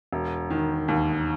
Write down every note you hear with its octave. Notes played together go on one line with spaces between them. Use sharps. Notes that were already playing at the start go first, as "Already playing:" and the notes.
E1
D#3
D#2